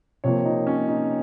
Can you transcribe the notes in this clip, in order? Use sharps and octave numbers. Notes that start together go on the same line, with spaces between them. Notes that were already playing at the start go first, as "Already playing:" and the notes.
C3 F3 A#3 C#5
D#4
C#4
D#4